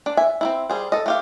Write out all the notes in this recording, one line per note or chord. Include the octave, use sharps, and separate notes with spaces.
D4
E5 G#5
C4 D#4 E4
G3 G#4 C5
A4 D#5
A3 G4 F5